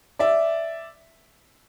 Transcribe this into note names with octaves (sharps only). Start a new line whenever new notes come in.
D5 E5